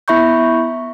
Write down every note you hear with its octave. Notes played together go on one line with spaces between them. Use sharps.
B3 E4 E5 B5 C#6 G6